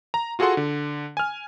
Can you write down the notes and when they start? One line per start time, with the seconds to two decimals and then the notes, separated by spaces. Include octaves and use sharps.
0.14 A#5
0.39 F4 F#4 G#4 A4 F#5 C6
0.57 D3
1.17 G#5 F6